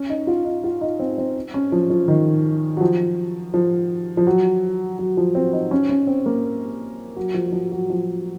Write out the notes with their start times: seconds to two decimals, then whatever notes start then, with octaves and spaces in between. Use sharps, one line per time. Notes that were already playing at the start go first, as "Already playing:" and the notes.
Already playing: C#4
0.10 D#4
0.27 F4
0.45 D#4
0.64 F4
0.81 D#4
0.99 C4
1.18 C4
1.54 C#4
1.72 F3
1.90 F3
2.08 D#3
2.77 F#3
2.81 F3
3.54 F3
4.17 F3
4.27 F#3
4.99 F#3
5.17 F3
5.35 C4
5.53 D#4
5.71 C#4
5.89 C#4
6.07 C4
6.26 A#3
7.16 F#3
7.34 F3
7.48 F#3
7.52 F3
7.72 F#3
7.90 F3